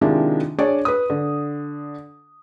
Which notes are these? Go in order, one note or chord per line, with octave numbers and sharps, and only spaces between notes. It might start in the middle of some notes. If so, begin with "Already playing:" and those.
C3 D#3 F3 G#3 D4 E4
D4 G#4 C#5 D5
B4 D#6
D3